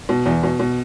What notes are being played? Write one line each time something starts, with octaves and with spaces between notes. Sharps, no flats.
B2
E2
B2
B2